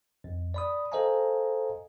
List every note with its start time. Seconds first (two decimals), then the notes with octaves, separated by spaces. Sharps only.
0.24 F2
0.54 D5 B5 D#6
0.92 A4 C5 D#5 F5 G#5 A#5